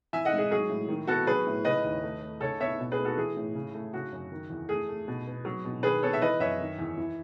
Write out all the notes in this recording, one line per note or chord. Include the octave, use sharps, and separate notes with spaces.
E3 E5 G#5
D#5 F#5
G#2
G#4
F#3 G#4
A2
D#3
B3 F#4 A4
F#3 G#4 B4
A2
C#3 B4 D#5
D#2
A3
A3
C#3 A4 C#5
B3 C#5 E5
B2
G#4 B4
A3
F#4 A4
E3 G#4
A2
C#3
A3
C#3 F#4
F#2
D#3
E2
A3 G#4
A3
B2
B3
F#3
B2
D#3 G#4 B4
B3 A4 C#5
E5
E3 B4 D#5
F#2 C#5 E5
D#3
E2
E3